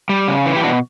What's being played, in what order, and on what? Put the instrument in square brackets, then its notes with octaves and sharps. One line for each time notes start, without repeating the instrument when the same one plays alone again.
[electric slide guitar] G3
C#3
E3
G4
B2 D4 F#4